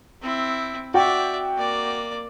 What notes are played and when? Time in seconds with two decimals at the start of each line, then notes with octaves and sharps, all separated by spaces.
0.22 C4 E4
0.94 F#4 D5 E5 G5
1.57 A#3 D5